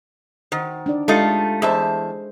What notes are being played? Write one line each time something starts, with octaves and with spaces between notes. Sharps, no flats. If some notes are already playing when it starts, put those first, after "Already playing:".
D#3 C5 F#5
D4 D#4 D5
G#3 A3 D#4 F4 G4 A4
E2 G#4 C5 D#5 E5 A5